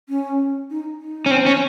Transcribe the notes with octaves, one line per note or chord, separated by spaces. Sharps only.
C#4
D#4
D#4
C#4
C4
C#4